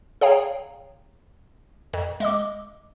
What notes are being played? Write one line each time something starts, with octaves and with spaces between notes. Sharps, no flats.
G#4 C#5 F5 G5 A#5
F2
G#3 D#5 D6